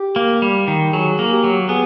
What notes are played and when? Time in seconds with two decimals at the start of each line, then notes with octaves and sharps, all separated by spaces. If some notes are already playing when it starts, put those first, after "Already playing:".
Already playing: G4
0.16 A#3
0.42 G3
0.68 D#3
0.93 F#3 G#4
1.19 A#3
1.31 G4
1.44 F#3
1.69 B3 G#4